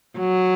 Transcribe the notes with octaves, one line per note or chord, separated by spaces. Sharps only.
F#3